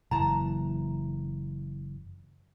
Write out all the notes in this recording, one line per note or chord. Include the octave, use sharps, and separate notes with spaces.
F#1 E3 A5 A#5